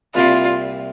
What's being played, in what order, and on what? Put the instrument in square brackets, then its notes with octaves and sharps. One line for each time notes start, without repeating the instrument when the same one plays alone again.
[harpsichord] C2 A#2 G3 C4 E4 [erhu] F4